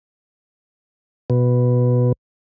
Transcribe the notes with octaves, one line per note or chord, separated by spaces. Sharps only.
B2